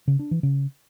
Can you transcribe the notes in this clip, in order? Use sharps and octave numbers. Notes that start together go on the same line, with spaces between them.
C#3
D4
E3
C#3